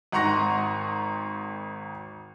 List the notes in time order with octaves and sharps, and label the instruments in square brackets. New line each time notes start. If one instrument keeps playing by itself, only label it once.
[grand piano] G#1 F#5 A#5 C6 C#6 A#6